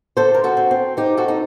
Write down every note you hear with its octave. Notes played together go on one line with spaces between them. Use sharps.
D3 A4 C5
A#4
F#4 A4
C4
C4
C4 D#4 G4
F#4 A4
D#4